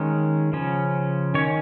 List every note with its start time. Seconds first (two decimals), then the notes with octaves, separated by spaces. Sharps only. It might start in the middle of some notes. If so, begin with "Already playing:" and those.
Already playing: D#3 G#3 C#4
0.53 C#3 F3 C#4
1.35 D#3 C#5
1.38 C#4